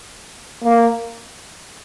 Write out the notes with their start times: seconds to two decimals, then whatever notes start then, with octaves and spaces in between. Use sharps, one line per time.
0.64 A#3